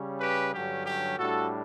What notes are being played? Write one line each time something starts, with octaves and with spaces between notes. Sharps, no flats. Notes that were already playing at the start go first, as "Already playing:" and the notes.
Already playing: C#3 G3 C#4
G4 B4
G2 D3 F#3 C#4 G4
G4
A2 G3 D4 F#4 A4